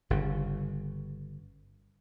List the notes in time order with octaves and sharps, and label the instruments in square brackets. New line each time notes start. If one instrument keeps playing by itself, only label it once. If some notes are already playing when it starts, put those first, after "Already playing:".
[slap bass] G1 C#3